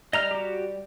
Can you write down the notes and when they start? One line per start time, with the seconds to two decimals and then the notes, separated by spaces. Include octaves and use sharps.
0.13 G3 D#5 A#5 F6
0.31 F#4 G4